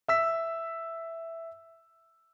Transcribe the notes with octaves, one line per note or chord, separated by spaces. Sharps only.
E5 E6 B6